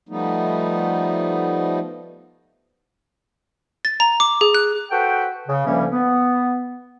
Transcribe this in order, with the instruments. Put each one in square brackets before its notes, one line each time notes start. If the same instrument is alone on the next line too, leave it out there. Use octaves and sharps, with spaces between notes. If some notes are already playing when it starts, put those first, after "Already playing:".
[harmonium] F3 G3 A3 B3 D#4
[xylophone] A6
A#5
D6
G#4
F#6
[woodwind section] F#4 A4 B4 C5 F#5 G5
C#3
D2 E3 F3 G3 A#3 C#4
B3